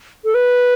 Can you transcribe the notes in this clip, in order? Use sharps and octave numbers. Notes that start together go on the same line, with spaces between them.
A4
B4